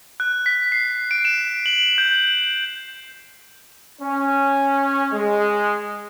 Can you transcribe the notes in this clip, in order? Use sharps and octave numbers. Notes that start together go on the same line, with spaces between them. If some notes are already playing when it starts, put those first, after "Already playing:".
F#6
B6
C7
D7
E7
F#7
G6
F#7
C#4
G#3